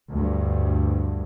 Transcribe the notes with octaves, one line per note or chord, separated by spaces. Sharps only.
D2 G2